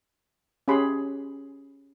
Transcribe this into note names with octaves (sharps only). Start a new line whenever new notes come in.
C#4 G4 G#4 B5 C6